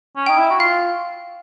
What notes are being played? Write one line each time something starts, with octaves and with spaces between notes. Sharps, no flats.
C#4
D#4 G5
E4
F#4
F4 F5